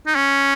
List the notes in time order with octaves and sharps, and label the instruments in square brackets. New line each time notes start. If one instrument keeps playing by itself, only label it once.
[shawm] D#4
C#4